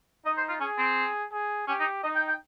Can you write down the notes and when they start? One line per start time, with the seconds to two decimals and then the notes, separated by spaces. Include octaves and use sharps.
0.25 D#4 D#5
0.37 C5
0.49 F4
0.60 C#4 G#4
0.78 C4
1.32 G#4
1.68 C#4 G4
1.80 D#4
2.03 D#4 D#5
2.16 G5
2.28 G5